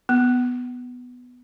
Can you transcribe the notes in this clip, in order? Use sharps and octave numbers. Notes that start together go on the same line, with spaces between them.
B3